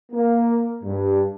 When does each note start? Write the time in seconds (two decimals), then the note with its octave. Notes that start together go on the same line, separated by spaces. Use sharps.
0.12 A#3
0.84 G2